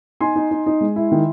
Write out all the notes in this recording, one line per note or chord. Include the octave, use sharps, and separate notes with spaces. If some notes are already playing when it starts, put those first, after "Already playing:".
D#4 G#5 C6
D#4
D#4
D#4
G#3
E4
D#3